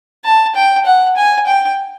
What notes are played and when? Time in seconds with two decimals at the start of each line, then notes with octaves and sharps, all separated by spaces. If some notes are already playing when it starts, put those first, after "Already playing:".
0.25 A5
0.55 G5
0.85 F#5
1.17 G#5
1.46 G5